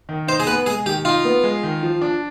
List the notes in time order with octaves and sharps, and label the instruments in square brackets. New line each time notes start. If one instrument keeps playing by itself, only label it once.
[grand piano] D#3
[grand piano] D#4 [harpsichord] C5
[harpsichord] G#4
[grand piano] B3 [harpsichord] B4
[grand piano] G#3 [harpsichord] G#4
[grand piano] D#3 [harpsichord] G4
[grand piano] D#4 [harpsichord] F4
[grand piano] B3
G#3
D#3
F3
D4